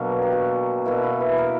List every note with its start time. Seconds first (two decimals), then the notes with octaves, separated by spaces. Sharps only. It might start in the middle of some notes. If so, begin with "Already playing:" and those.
Already playing: B2 D3 F#3 A#3
0.23 G4
0.32 F#4
0.85 B2 A#3 E4
1.03 E4
1.20 B4
1.38 A#4